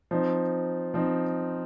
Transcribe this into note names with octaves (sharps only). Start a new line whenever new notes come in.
F3 C4 D#4
F3 C4 D#4